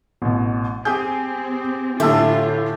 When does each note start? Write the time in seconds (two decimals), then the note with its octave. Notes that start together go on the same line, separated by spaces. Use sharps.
0.22 A1 B2
0.85 C4 G4 G#4 G6
2.00 A2 D3 F4 G4 A4 E5